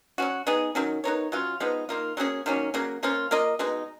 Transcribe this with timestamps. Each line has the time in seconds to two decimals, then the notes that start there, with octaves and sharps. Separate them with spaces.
0.18 F#3 C#4 F#4
0.47 B3 D#4 G#4
0.75 D#3 F#3 C#4
1.04 B3 D#4 A#4 C#5
1.32 F#3 C#4 F4
1.60 F3 G#3 B3 D#4
1.89 D#3 A#3 F4
2.17 F#3 A#3 C#4 G#4
2.46 D#3 F#3 A#3 C#4
2.74 C#3 F#3 A#3
3.03 F3 A#3 C#4 F4
3.31 A#3 F4 A#4 D#5
3.59 B2 G#3 D#4